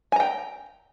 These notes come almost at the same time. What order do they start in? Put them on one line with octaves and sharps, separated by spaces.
G#5 A#5 G5